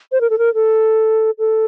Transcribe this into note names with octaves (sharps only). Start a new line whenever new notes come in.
C5
A#4
A4
A#4
A4
A4